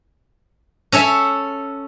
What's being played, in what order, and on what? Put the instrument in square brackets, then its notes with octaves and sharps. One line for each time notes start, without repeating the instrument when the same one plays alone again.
[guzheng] C#4 A4 C#5 E5